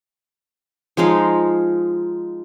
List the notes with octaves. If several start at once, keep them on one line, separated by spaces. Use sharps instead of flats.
F3 G#3 D#4 F5